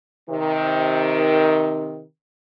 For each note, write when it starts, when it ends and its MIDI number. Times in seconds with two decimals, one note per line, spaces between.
0.28 2.01 48
0.28 2.01 51